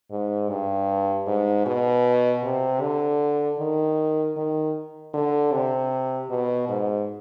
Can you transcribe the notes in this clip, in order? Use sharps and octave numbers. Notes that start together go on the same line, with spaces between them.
G#2
G2
G#2
B2
C3
D3
D#3
D#3
D3
C3
B2
G#2